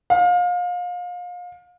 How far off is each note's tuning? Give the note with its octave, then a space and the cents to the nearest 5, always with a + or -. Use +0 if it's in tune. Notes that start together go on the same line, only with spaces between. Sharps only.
F5 +30